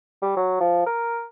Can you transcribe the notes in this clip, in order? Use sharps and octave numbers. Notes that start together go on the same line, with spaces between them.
G3
F#3
F3
A#4